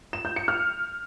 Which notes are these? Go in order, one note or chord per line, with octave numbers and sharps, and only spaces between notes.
E7
G6
C#7
F6